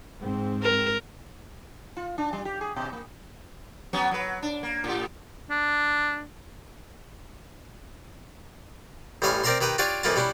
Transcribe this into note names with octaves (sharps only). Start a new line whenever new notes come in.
G#2 C4
A#4
F4
D4
G3
G4
G#4
B2
A#3
F#3 B3 C#4
F#3 B4
D4
A#3
A2 G4
D4
A1 G3 C#4 E5 F5 G#5
C4 A#4 D5 E5 A#5 C6
D#3 G4 B4 E5 A#5
D4 F4 G4 C#5 D5
F2 E3 A#3 E4 F4 A5
G3 C#4 D4 E4